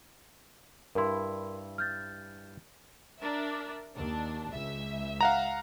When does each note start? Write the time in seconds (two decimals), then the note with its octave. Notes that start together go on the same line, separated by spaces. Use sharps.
0.95 G2 E4 A#4 C6
1.78 F6 G6 A6
3.19 D4 A#4 E5
3.95 D#2 D4
4.51 C#2 E5
5.21 F5 F#5 A#5